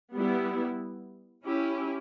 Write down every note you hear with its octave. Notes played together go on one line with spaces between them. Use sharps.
G3 B3 E4
C#4 E4 G4